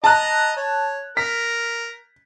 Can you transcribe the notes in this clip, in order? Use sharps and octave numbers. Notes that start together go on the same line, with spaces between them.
D#5 A5 A#5 F#6
C#5
A#4 B6